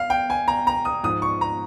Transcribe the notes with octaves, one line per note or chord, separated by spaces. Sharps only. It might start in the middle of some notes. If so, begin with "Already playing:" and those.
Already playing: F5
G5
G#5
A#5
A#5
D#6
G#2 F3 D#6
C#6
A#5